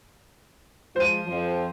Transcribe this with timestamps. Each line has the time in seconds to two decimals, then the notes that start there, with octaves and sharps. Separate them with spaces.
0.96 F3 G#3 F4 C5 D#7
1.27 F2 F3